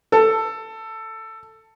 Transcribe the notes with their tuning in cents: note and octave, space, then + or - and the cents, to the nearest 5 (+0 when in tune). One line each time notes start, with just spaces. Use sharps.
A4 +10